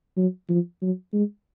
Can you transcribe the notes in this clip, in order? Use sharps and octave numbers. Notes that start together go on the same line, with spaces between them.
F#3
F3
F#3
G#3